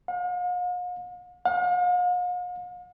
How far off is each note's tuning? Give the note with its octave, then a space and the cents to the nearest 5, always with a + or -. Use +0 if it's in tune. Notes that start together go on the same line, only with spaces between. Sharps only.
F5 +45
F5 +45